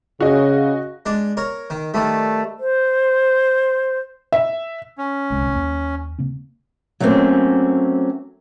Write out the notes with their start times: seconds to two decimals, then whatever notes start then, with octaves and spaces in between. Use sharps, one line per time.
0.21 C#3 F#4 D#5
1.06 G#3 D4
1.37 A#4 C#5 A#5
1.70 D#3
1.94 D#3 G3 A3
2.59 C5
4.32 E5
4.98 C#4
5.30 D1 C2 G#3
5.53 D#2 A#3
6.19 C#3 A#3 C4
7.00 F#3 G3 A3 A#3 C4 C#4